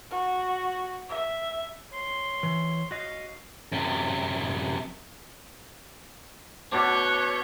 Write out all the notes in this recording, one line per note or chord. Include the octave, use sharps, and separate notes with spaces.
F#4
E5
C#5 C6
E3
F#4 D#5 F5
F#2 C3
B2 D4 C#5 D6 G6